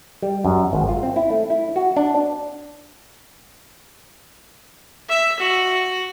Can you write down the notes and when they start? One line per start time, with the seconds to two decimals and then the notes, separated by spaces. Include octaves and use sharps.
0.23 G3
0.45 F#2
0.73 G#1
0.89 F4
1.03 C4
1.16 E4
1.30 A3
1.50 E4
1.76 F#4
1.97 D4
5.09 E5
5.39 F#4